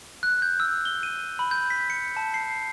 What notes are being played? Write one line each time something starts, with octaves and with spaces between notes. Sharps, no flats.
F#6
G6
E6
G7
D#7
B5
G6
B6
C#7
A5
C7